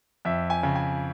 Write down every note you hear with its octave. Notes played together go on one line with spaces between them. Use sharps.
F2 E5
G#5
C#3
G#5